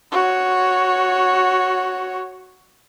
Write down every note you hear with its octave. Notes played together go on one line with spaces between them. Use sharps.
F#4 C#5